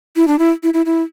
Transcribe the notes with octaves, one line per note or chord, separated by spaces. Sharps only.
E4
D4
E4
E4
E4
E4